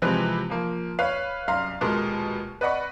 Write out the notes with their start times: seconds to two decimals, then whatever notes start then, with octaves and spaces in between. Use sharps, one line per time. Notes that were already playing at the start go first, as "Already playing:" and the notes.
0.02 C3 E3 F3 G#3 C4 B4
0.50 F3 A#3
0.99 B4 C#5 F5
1.48 C2 F#2 F5 A#5 C6 F6
1.81 D#1 B2 G#3 A#4 C6
2.61 B4 D5 D#5 F#5 B5 C#6